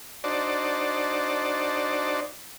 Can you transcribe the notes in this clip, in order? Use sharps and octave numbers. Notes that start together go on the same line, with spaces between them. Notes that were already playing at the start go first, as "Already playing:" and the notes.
D4 D#4 F#4 C5 D5 A5